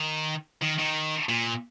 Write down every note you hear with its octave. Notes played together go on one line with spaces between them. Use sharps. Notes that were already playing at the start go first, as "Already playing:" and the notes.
Already playing: D#3
D#3
D#3
A#2